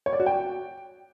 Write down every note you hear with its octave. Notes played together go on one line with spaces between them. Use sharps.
C#5
D5
F#4
G5